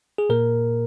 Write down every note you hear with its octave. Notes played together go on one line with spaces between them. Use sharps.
G#4
A#2 A#3 A#4